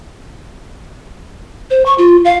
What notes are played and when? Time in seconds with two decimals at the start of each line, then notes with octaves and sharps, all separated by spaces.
1.70 C5
1.86 C#6
1.98 F4
2.25 F5